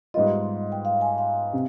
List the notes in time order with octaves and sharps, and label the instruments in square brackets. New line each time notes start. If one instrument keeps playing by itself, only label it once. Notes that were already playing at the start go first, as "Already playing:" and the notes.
[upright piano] G#2 G3 B3 F4 [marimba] D#5
[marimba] G5
F5
G#5
F5
[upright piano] C3